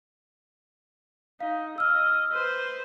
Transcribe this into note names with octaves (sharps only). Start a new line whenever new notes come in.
D#4 F5
D#5 E6 F6
B4 C5